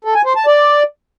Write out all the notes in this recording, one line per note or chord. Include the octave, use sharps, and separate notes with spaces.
A4
G#5
C5
A5
D5